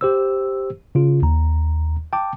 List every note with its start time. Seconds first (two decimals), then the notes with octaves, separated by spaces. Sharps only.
0.01 G4 C5 E6
0.95 C#3 F4
1.22 D#2 A#5
2.13 G5 A5 D6